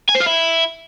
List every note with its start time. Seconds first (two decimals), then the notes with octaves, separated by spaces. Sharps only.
0.09 G#5
0.15 C5
0.21 F4
0.26 E4